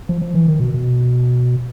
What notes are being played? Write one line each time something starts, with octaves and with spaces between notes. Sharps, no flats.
F3
F3
E3
D#3
B2
B2